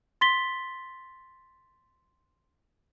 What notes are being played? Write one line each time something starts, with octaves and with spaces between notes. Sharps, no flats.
C6 A6 B6 G7